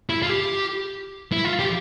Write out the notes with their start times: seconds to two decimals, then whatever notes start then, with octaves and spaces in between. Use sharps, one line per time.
0.10 E4
0.23 F4
0.29 G4
1.33 E4
1.45 F4
1.59 G4